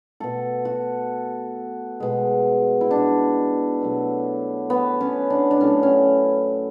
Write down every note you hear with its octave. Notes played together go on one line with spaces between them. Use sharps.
B2 A3 A4
F#4
B2 G#3
E4
D4
B2 F#3 A3
B3
C#4
D4
D4
A2 F#3 A3 C#4
C#4